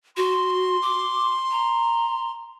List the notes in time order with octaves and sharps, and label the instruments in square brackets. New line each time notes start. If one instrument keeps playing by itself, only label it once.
[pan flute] F#4 [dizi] C6
[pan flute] D6
A#5